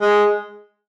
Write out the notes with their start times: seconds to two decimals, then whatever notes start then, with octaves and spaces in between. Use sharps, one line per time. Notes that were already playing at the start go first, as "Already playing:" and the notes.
0.01 G#3